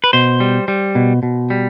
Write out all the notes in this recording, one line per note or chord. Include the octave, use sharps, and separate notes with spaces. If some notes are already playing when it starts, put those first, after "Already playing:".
B4
B2 C5
G3
G3
B2
B2
G3